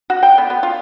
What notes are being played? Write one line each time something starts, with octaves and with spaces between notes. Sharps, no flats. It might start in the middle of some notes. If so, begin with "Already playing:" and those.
F#4
G5
B3
B3
F4